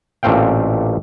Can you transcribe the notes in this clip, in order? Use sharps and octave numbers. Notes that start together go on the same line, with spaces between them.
A1 A#2 A3 C4 F5 G5